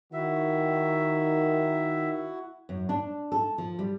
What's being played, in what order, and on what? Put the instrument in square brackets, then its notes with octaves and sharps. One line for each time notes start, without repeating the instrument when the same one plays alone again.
[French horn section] D#3 [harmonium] E4 F#4 F#5 [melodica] E5
[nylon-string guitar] F#2
D4
A4
F3
G3